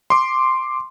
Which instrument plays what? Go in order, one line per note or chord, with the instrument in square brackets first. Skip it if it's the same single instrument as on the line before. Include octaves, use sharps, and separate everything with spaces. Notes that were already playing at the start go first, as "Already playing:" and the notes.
[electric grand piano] C6 D6